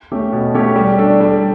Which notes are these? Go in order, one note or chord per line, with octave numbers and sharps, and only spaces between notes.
A3 C#4 G4 C#5
B2
A3 C#4 G4 C#5
G3
D4 A4
G3